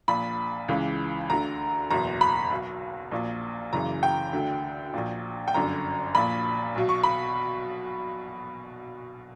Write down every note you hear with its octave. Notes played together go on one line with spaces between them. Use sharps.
A#1 A#2 B5
C#2 C#3 E3
D2 D3 A#5
F#1 E2 B2 A#5
B5
B1 B2
A#1 A#2
F#1 F#2 C#3 E3 A#5
G5
D2 D3
A#1 A#2
G5
G1 F#2 D3 A#5
A#1 A#2 B5
B1 B2
C#6
B5